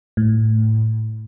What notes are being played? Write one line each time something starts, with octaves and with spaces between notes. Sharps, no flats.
A2